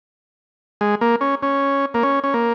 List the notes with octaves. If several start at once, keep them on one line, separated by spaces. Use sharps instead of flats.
G#3
A#3
C#4
C#4
A#3
C#4
C#4
A#3